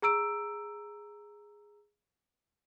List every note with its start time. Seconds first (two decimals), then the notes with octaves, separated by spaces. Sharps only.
0.02 G#4 A#5 E6 D7